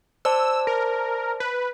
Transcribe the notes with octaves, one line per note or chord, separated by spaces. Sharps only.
C5 D5 A5 E6
A#4
B4